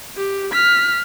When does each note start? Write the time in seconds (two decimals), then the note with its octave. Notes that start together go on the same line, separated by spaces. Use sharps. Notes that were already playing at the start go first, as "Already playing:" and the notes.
0.18 G4
0.52 F6 B6